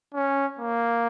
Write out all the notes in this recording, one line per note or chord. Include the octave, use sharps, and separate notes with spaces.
C#4
A#3